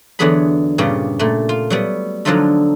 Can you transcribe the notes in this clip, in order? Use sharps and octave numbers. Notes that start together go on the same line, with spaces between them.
E2 D3 F#3 B3 G#4 B5
G2 A#2 C#3 B3 G4
A#2 A3
F4
F#3 G3 B3
D3 F3 F#3 D#4 F4 A4